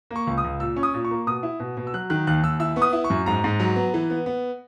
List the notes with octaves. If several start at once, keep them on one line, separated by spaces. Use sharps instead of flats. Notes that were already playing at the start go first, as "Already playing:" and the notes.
A#3
C#6
C#2
D#6
C#2
A#2 E6
C#4
D#6
A#2
C#6
A#3
B2 D#6
E4
B2
B2
E6
F#3 F#6
D#3 F#6
D#2 F#6
D#2 E6
E4 E6
B3 C#6
D#6
E4
C#6
F#2
G#2 A#5
G#2
F#3
B3
E3
B3
B3